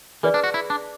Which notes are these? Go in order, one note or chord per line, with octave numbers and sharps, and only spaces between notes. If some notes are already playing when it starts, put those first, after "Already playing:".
E3 G#4 B4 D5
D4
F#4
E4
D4